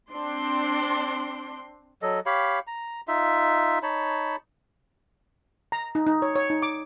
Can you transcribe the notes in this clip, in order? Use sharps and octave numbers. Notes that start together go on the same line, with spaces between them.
C4 D4 C6
F#3 A4 D#5
G4 C#5 F5 B5
A#5
D#4 F4 E5
D#4 C#5 A5 B5
A#5
D#4
D#4
C#5
C#5
D#4
D6